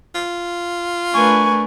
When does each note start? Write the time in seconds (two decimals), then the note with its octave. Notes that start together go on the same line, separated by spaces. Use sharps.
0.15 F4
1.14 A3 D4 A#4 B4 G#5 C#6